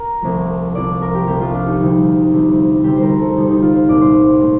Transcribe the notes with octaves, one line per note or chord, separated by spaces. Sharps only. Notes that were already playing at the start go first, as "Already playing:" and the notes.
Already playing: A#4
C2 C3 F3 A3 C4
C2 C3 F3 A3 C4 D5
A#4
G4
C2 C3 F3 A3 C4 G4
F4
D4
D#4
D2 C3 G3 C4 D#4
D2 C3 G3 C4
D2 C3 G3 C4 G4
A#4 C5
A4
D2 C3 G3 C4 D#4
D#4
F4
C5
C2 A#2 A3 C4 D5
C5
A#2 A3 C4